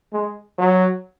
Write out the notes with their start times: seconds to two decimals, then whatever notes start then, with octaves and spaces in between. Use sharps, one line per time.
0.12 G#3
0.58 F#3